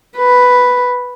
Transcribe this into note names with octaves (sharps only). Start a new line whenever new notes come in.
B4